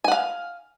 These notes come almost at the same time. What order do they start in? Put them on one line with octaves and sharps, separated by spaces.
G#5 F#5 F5